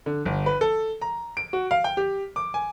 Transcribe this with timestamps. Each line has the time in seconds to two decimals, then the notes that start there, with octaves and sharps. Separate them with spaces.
0.06 D3
0.25 G1
0.46 B4
0.61 A4
1.01 A#5
1.37 D7
1.53 F#4
1.71 F5
1.84 G5
1.97 G4
2.36 D6
2.54 G#5